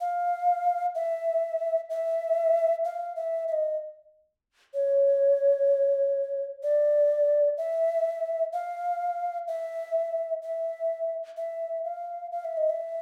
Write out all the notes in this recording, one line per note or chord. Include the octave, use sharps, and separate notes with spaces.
F5
E5
E5
F5
E5
E5
D#5
C#5
D5
E5
F5
E5
E5
E5
F5
F5
E5
D#5
E5